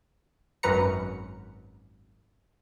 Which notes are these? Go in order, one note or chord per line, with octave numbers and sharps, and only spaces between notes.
G#1 F#2 B4 A#5 C#7